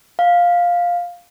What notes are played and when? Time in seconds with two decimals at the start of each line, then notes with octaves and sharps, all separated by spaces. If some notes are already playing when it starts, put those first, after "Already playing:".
0.19 F5